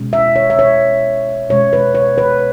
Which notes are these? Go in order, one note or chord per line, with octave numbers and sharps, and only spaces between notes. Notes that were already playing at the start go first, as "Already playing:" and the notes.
Already playing: B2 G#3 C#4
E5
C#5
E5
C#5
B2 G#3 C#4 C#5
B4
C#5
B4